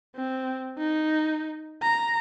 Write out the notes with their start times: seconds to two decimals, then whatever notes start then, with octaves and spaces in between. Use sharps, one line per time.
0.16 C4
0.78 D#4
1.83 A#5